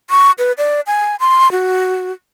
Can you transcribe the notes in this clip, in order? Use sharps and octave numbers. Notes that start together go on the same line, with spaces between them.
C#6
B4
D5
G#5
C6
F#4